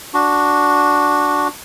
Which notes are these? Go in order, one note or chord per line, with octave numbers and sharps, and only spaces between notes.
D4 F#4